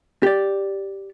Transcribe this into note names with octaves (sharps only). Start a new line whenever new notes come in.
G4 D5